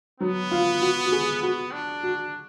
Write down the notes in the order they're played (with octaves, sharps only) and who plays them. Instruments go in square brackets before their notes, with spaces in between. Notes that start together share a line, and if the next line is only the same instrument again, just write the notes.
[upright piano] F#3 [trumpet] B3
[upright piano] F4
F#4
F#4
G#4
[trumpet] B3 [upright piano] F#4
[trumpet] D4
[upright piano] F#4